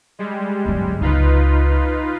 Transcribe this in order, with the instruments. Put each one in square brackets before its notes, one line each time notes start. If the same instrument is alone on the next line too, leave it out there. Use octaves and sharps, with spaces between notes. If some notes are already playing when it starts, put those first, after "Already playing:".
[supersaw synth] G3 G#3
[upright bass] G1 F#2
[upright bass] C#2 [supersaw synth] D#4 F4 B4